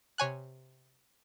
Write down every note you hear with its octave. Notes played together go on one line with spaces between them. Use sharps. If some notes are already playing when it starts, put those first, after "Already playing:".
C3 C#5 G#5 F#6